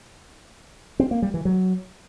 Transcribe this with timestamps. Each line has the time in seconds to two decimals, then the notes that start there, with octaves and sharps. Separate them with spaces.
1.00 C4
1.11 A#3
1.22 G3
1.34 E3
1.45 F#3